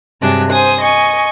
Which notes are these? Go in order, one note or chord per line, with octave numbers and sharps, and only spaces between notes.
G2 C3 F#3 D4 G#4
C5 G#5 D#6
D#5 G#5 C#6